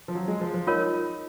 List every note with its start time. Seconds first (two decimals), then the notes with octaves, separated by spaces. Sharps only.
0.08 F3
0.15 F#3
0.28 G#3
0.41 F3
0.54 F3
0.67 D#4 F4 A#4 C#5